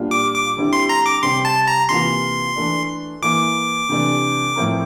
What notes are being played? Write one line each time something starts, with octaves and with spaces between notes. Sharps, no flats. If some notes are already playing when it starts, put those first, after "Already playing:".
Already playing: A#2 G3 D4 F4
D6
D6
D3 G3 C4 E4 G4
C6
A#5
D6
C3 G3 C4 G4 C6
A5
A#5
C3 E3 A#3 F4 C6
E3 A3 D4
E3 A#3 E4 D6
C3 E3 A3 D4
A2 F3 C4 E4 A#4